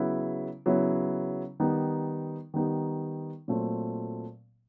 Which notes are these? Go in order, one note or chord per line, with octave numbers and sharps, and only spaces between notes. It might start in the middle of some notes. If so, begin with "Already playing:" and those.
Already playing: C#3 F#3 B3 E4
C#3 F#3 B3 E4
D#3 G3 B3 D#4 G4
D#3 G3 B3 D#4 G4
A#2 F#3 A3 C4